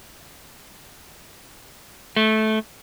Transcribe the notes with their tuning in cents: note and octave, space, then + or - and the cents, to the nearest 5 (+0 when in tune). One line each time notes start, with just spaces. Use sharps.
A3 -15